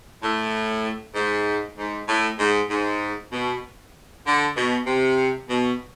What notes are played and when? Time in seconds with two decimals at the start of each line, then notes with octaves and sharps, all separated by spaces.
0.23 A2
1.15 G#2
1.78 G#2
2.08 A2
2.39 G#2
2.70 G#2
3.32 B2
4.26 D3
4.56 B2
4.87 C3
5.49 B2